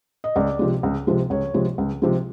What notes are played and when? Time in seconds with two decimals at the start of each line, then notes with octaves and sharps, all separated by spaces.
0.24 D#5
0.36 C#2 D5
0.59 C3 F3 G#3
0.83 C#2
1.07 C3 F3 G#3
1.30 C#2 C#5
1.54 C3 F3 G#3
1.78 C#2
2.02 C3 F3 G#3